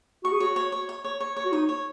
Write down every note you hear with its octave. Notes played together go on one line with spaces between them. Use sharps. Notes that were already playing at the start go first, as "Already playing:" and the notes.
F#4 C#6
G#4
F#4 C#5
C#5
C#5
C#5
C#5
C#5
C#5
F#4
D#4 C#5
C#5